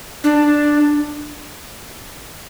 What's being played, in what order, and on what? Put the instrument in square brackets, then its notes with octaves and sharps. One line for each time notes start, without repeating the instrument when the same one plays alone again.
[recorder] D4